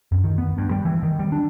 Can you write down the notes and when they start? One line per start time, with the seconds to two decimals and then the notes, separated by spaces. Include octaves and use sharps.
0.12 F#2
0.24 D#3
0.38 B3
0.58 G2
0.71 G3
0.85 E3
1.03 D#3
1.19 G3
1.32 D4